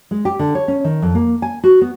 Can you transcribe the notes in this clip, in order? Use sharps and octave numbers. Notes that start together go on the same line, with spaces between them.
G#3
G4
D3
C#5
C#4
D#3
F2
A#3
G#5
F#4
B3